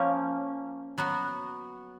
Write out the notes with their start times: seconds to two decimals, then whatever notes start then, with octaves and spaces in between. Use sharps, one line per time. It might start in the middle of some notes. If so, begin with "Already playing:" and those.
Already playing: F3 A#3 C#4
0.98 F#3 B3 F#4